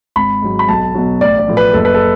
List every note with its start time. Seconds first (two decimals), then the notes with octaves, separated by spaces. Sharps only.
0.16 G#1 B5
0.42 G#2 F#3
0.59 B5
0.68 B1 A5
0.94 B2 F#3
1.21 A1 D5
1.39 D5
1.48 A2 F3
1.57 B4
1.73 F#1 A4
1.85 B4
1.94 A4